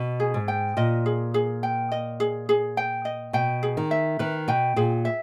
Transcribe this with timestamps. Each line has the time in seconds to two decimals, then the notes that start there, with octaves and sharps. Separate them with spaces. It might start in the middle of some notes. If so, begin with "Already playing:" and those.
Already playing: B2
0.20 G#4
0.34 G#2
0.48 G5
0.77 A#2 D#5
1.06 G#4
1.34 G#4
1.63 G5
1.92 D#5
2.20 G#4
2.49 G#4
2.77 G5
3.05 D#5
3.33 B2 G5
3.63 G#4
3.77 D#3
3.91 E5
4.19 D#3 B4
4.48 B2 G5
4.76 A#2 G#4
5.05 E5